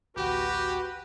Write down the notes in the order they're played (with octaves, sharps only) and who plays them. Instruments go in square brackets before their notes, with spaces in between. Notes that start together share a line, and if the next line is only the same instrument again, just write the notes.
[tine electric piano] A1 D2 [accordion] F#4 [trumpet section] G4 [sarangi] B4